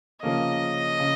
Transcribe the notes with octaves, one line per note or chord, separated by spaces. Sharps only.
C#3 F3 A#3 C#4 D#5
C#3